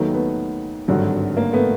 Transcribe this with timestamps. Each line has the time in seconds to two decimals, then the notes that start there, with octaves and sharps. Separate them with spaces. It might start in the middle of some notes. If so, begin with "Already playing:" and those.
Already playing: D#2 D#3 F#3 A3 B3
0.13 A3 B3
0.88 G#1 G2 D3 F#3
1.37 A#3
1.53 A3 B3